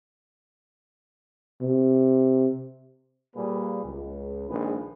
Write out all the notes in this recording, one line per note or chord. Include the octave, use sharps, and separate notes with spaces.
C3
A#2 G3 A#3 G#4 B4
C#2
A#1 D#3 G#3 G#4 B4